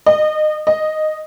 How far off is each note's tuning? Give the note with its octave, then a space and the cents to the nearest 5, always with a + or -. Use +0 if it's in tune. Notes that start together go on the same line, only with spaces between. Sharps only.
D#5 -25
D#5 -10